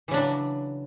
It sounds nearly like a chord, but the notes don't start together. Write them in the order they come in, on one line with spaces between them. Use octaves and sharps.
E3 C#3 D4 F#3